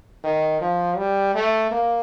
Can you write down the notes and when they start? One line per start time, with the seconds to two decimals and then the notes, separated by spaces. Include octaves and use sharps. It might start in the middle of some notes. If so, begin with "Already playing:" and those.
0.24 D#3
0.61 F3
0.97 G3
1.34 A3
1.71 A#3